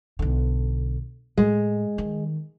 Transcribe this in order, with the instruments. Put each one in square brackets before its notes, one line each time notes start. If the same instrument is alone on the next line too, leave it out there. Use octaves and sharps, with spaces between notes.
[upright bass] B1 D3
[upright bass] A2 [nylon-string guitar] G#3
[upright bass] D#3